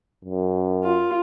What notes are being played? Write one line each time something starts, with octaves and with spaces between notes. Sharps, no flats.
F#2
F4